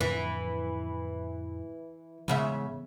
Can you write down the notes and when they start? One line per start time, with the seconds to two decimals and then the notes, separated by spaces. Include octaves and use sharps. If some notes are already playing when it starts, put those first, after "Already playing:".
0.01 F2 A2 D3 E3
2.28 G#2 C#3 E3 A3 B3 E5